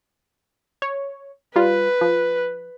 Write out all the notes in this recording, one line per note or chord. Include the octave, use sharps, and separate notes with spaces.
C#5
G3 F4 B4
F3